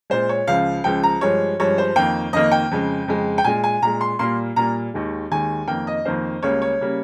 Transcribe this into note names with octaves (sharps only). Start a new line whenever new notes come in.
A#2 G#3 C5
C#5
C#2 C#3 F3 F5
C#2 C#3 F3 G5
A#5
G2 F3 G#3 C#5
G2 F3 G#3 C#5
C5
F2 D#3 A#3 G5
F2 D#3 A#3 D#5
G5
F2 C#3 G#3
F2 C#3 G#3
G5
A#2 G#3 G#5
G#5
A#2 G#3 A#5
C6
A#2 G3 A#3 C6
A#2 G3 A#3 A#5
D#2 D#3 G#3
D#2 D#3 G#3 G#5
F2 D#3 A#3 G5
D#5
F2 D#3 A#3 C5
C#2 C#3 G3 A#3 C#5
C#5
C#3 G3 A#3